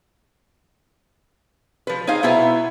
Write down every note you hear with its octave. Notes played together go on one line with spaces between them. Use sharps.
F3 B4
D#4 G#4 C5 F5
B2 B3 E4 E5 A#5